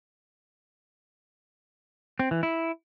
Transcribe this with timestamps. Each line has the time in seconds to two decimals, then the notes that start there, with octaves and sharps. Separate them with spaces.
2.19 C4
2.31 E3
2.43 E4